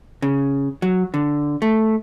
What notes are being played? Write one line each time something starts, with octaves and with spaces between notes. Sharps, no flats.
C#3
F#3
D3
A3